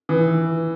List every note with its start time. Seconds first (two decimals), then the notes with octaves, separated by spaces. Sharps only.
0.09 E3